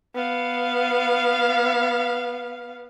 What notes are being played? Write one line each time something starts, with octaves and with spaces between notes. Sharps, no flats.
B3 F5